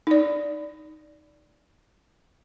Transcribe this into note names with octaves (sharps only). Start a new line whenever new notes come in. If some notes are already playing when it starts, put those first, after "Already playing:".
D#4 D5